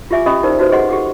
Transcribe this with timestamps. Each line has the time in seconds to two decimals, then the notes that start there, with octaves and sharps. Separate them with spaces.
0.11 F4 G4 E5 G#5 D6
0.26 C#4 G4 D#5 B5 D#6
0.43 C#4 D#4 G4 A#4 C5 D5
0.59 D#4 F#4 B4 C5
0.71 G4 G#4 D#5 F#5 C6
0.89 G4 A4 F#5 D6